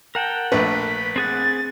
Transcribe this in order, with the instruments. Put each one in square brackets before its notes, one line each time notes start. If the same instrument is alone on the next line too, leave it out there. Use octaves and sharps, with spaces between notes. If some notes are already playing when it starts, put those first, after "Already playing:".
[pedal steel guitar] A#4 F#5 A5 [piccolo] G5
[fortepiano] A#1 A3 B4 [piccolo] B6
[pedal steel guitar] C4 G#4 F#5 [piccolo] A6